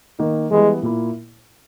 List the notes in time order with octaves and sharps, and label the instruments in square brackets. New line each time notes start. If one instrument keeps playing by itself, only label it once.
[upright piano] D#3 A#3 D#4
[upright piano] E3 G3 B3 E4 [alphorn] G#3
[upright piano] A#2 A#3 E4